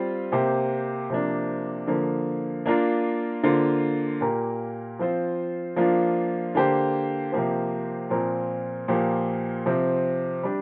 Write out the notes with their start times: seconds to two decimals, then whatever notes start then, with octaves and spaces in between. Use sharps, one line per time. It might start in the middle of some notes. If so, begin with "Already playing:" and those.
Already playing: G3 C4 F4
0.32 C3 A#3 G4 C5
1.10 C3 F3 A#3 D4
1.87 D3 F3 A#3
2.66 A#3 D4 F4 A#4
3.43 D3 A#3 F4 C5
4.21 A#2 A#3 G4 A#4
4.99 F3 C4 F4 C5
5.76 F3 A#3 D4 F4
6.55 D3 A#3 G4 C5
7.32 C3 F3 A#3 G4 C5
8.10 A#2 F3 C4 A#4
8.88 A#2 F3 A#3 G4
9.66 C3 F3 C4
10.43 G3 D4 G4